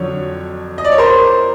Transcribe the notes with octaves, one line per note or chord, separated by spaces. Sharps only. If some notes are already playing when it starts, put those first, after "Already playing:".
Already playing: F2 D3 F#3 C#5
D#5
D5
C#5
A#4 C5